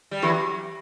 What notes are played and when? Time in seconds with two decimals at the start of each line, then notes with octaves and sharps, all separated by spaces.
0.11 G3
0.22 E3 F#3 G4